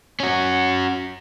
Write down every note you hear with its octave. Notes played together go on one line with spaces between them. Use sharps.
C#4 F#4